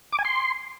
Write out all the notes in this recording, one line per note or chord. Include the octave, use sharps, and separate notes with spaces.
D6
G#5
C6